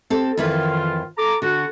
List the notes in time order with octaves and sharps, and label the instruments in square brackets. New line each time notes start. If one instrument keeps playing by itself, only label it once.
[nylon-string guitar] C4 G4 A4
[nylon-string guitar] F2 E3 B4 [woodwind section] D#3 F4
[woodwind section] A4 A#5 D6
[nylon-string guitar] D3 [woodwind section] F#4